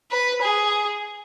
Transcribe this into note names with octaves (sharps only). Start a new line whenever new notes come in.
B4
G#4